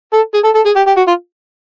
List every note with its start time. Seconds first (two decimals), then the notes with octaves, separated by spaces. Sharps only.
0.13 A4
0.34 G#4
0.44 A4
0.55 A4
0.66 G#4
0.76 G4
0.87 G4
0.97 F#4
1.08 F4